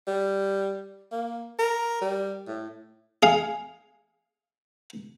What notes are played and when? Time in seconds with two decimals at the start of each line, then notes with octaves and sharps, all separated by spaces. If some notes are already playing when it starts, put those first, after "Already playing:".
0.07 G3
1.12 A#3
1.59 A#4
2.01 G3
2.47 A2
3.23 G#4 F5